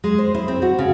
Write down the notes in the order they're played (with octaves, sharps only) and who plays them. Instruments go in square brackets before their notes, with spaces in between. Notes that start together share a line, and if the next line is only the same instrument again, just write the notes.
[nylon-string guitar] G#3
C5
E4
C4
F#4
C#3